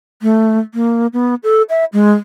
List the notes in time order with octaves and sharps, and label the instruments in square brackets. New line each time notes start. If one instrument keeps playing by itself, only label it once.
[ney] A3
A#3
B3
A4
E5
G#3